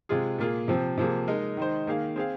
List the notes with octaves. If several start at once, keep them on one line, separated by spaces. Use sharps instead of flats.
C3 G#3 F4 G#4
A#2 A#3 F4 G#4
C3 F3 C4
C3 F3 A#3 G#4
G#3 D#4 A#4
D#3 G#3 D#4 C5
D#3 A#3 G#4 F5
C4 G#4 F5